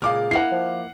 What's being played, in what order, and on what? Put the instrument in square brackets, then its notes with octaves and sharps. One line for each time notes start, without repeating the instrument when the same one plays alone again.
[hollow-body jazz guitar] C#2 A#2 [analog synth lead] G#4 [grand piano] F5 D6 F6
[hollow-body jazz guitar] A#3 E4 [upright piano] F#5 C7
[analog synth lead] F3